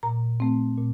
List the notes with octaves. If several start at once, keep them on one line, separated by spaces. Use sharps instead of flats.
A#2 A#5
A3 C4
A#2